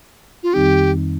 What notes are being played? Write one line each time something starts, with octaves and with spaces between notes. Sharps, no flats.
F4
F2 D#3 G3 C4 D#4 G4